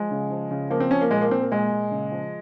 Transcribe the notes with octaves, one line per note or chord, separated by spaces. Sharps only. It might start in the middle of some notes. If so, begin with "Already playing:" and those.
Already playing: F3 G#3
C#3
F3
C#3
F3 A#3
C4
F3 C#4
A#3
A#2 G#3
A#3
A#2 C4
A#3
A#2 G#3
A#2
C#3
F3